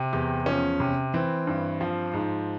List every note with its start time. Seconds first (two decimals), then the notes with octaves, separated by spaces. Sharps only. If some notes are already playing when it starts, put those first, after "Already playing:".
Already playing: C3
0.13 E2 G4
0.46 F3 C#4
0.80 C3
1.14 E3 C4
1.47 G2
1.81 F3
2.13 G#2